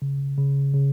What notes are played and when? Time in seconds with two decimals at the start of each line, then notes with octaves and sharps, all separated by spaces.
0.02 C#3
0.38 C#3
0.74 C#3